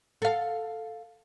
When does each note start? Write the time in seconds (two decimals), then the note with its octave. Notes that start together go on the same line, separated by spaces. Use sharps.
0.22 A4 F5